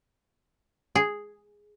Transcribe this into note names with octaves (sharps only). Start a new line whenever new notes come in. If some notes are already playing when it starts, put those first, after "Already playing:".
G#4